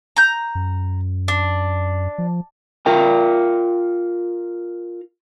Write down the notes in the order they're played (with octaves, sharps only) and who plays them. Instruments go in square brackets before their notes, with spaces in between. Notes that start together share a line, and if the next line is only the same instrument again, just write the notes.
[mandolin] A#5 G6
[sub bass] F#2
[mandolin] D4
[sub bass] F3
[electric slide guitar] F4 A#4 G5